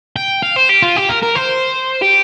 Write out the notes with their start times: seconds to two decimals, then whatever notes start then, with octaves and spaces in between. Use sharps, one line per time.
0.16 G5
0.42 F5
0.56 C5
0.69 G4
0.82 F4
0.96 G4
1.09 A#4
1.23 A#4
1.36 C5
2.02 G4